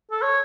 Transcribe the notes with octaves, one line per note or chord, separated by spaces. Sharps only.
A4
C#5